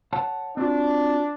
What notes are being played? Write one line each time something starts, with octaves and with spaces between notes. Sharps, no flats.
C#5 F#5 A5
C4 D4 F4 F#4